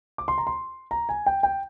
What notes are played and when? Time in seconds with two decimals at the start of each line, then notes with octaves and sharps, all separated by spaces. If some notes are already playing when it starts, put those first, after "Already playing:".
0.18 D6
0.28 C6
0.38 A#5
0.47 C6
0.91 A#5
1.09 G#5
1.26 G5
1.43 G5